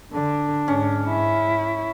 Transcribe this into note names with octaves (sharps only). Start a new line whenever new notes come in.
D3 D4
G#2 C#4
E4